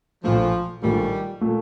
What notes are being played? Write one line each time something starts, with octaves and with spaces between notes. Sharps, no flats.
A#1 A#2 F3 A3
A#1 A#2 D#3 G3 A3
A#2 A3